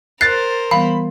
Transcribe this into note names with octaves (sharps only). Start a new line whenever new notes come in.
A#4 C5 F#6 A6 C7
E3 G3 B3 F5 B5